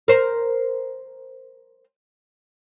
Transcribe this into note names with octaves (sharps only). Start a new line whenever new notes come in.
A#4 C5